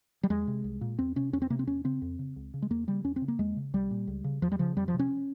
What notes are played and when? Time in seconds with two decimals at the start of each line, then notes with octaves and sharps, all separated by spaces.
0.23 G3
0.30 E2 G#3
0.47 C3
0.64 C2
0.81 A#2
0.99 E2 C4
1.16 C3 C#4
1.33 E2 C#4
1.42 C4
1.50 C3 A#3
1.59 C4
1.67 E2 C#4
1.84 C#3 C4
2.02 F2
2.19 C#3
2.36 C#2
2.54 C#3
2.62 G#3
2.70 E2 A#3
2.87 C#3 G3
3.04 E2 C#4
3.16 C4
3.22 C#3
3.28 A#3
3.39 E2 G#3
3.56 C#3
3.74 C2 G3
3.91 A#2
4.07 C#2
4.24 C#3
4.42 E2 F3
4.52 G3
4.59 C#3 F3
4.77 F2 G3
4.88 F3
4.94 C3
4.99 C#4